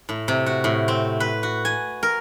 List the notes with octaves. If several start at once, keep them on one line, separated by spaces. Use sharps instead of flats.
A2
C3
F#4
A2
C4
B4
F#4
G#5
A#4